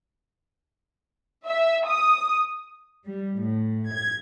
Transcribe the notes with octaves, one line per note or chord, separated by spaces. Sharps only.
E5
D#6
G3
A2
G#6